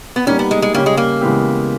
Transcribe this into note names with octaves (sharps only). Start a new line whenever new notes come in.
B3
G3 A#3 C#4 D#4 G4
B3
G#3
G#3
C#3 G3 A#3 C#4 G4 C#5
G#3
A#3
C#3 E3 G#3 B3 G4